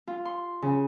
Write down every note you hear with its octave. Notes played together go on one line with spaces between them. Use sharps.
F4
C6
C#3